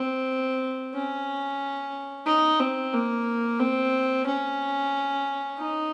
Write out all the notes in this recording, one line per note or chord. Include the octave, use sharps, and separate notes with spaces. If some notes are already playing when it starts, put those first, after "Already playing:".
Already playing: C4
C#4
D#4
C4
A#3
C4
C#4
D#4